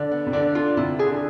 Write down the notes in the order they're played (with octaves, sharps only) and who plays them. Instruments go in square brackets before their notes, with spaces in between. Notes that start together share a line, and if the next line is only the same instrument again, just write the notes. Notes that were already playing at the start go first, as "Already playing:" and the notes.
Already playing: [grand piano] D3 [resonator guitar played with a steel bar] D5
[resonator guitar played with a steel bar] B3
[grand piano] C3
[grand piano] D3 [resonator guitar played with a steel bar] D5
[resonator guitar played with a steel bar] F4
[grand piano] C3 [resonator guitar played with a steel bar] E4
[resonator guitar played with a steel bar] G#4
[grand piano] D3